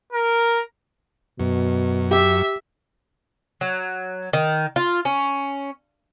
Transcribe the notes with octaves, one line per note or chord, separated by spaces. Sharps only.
A#4
F#2 B2
G4 E5
F#3
D#3
F4
C#4